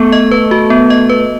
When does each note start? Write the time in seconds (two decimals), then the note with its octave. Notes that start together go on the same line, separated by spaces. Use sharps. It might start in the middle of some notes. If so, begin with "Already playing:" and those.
Already playing: A3 B3
0.12 D#5
0.31 B4
0.51 F#4
0.70 B3
0.90 D#5
1.09 B4